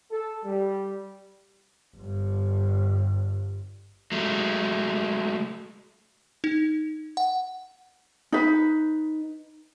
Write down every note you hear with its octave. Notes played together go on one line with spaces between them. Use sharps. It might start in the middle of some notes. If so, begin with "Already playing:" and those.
A4
G3
G1 G2
F#3 G#3 A3
D#4
F#5
D#4 B4